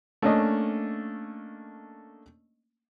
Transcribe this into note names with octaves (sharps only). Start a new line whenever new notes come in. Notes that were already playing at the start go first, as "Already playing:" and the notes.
A3 A#3 C#4 D4 D#5